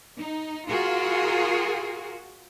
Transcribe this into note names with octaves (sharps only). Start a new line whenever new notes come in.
D#4
F4 F#4 G#4 A#4